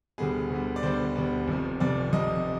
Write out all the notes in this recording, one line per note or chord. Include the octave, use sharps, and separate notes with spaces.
D2 D3 G3 B3 G#4
D2 D3 G3 B3
D5
D2 D3 G3 B3 C5
D2 D3 G3 B3
F1 F2 C3
F1 F2 C3 D5
F1 F2 C3 D#5